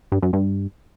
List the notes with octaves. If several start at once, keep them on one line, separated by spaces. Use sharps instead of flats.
G2
F#2
G2